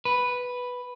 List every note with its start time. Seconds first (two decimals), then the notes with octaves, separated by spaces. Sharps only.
0.05 B4